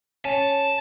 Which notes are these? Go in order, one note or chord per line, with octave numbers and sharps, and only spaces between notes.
C#4 A5